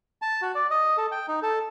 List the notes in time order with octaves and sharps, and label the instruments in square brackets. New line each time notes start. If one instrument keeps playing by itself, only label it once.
[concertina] A5
F#4
D5
D#5
A4
G5
D#4
A4